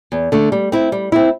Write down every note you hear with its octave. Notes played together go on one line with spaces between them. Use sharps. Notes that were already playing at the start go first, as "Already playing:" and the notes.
E2
D3 A3
G3
C4 E4
G3
C4 E4